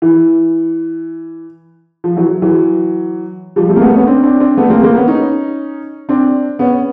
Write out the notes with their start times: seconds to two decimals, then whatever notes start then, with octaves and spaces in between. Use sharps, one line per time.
0.02 E3
2.04 F3
2.16 E3 F#3
2.42 E3 F#3
3.56 F3 G3
3.69 G3 A3
3.76 A#3
3.81 A3 B3
3.94 B3 C#4
4.07 C4 D4
4.23 C4 D4
4.40 C4 D4
4.57 A3 B3
4.70 A#3 C4
4.83 A#3 C4
4.96 B3 C#4
5.08 C#4 D#4
6.09 C4 D4
6.59 B3 C#4